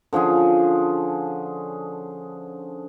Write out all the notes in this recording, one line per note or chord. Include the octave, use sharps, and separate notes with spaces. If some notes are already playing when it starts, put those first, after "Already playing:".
D3 F3 C#4 G#4